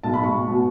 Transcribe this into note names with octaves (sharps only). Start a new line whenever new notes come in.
B1 A5
B5
B1
C#6
B1
B2